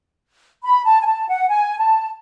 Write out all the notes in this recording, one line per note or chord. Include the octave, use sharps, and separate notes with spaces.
B5
A5
G#5
A5
F#5
G#5
A5